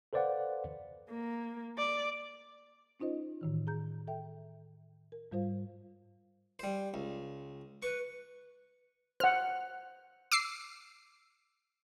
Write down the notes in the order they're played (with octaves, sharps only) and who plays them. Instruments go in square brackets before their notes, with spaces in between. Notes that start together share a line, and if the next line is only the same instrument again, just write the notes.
[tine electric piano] A4 B4 C5 D5 F5 F#5
[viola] A#3
D5
[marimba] C#4 D#4 F4 C5 D#5
A2 D#3 E3
G#4 A#5 G6
A4 E5 G5
A#4
G#2 G3 F4 C5 F5
[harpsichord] G3 C5
C#2
[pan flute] B4 [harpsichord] C#6
[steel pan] C5 F#5 [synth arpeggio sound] F6
[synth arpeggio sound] D6 E6 C7